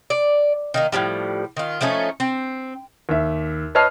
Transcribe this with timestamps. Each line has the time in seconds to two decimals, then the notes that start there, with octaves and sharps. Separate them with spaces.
0.10 D5
0.74 D#3 A#3 D#4
0.92 A2 C3 F3 G3
1.57 D#3 F4
1.81 F3 A3 C#4 D#4
2.20 C4
3.09 D#2 E5
3.75 B4 C#5 D#5 A5 F6 C7